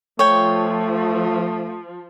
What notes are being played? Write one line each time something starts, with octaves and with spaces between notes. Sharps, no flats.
F3 A3 C#5 G5